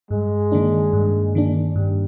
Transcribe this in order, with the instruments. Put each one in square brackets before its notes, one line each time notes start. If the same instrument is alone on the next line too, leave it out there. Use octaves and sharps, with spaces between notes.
[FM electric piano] G2 [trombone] G#3
[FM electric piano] D#3 A#3 D4
G2
D#3 A#3 D4
[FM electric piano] G2 [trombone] G3